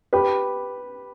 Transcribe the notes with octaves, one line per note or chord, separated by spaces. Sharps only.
G4 B4